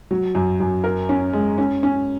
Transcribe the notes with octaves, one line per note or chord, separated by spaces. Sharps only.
F#3
F#2
F#2
A#4
C#4
G#3
C#4
C#4